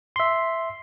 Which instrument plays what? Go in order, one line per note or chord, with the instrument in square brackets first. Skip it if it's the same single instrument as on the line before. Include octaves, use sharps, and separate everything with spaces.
[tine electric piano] E5 C6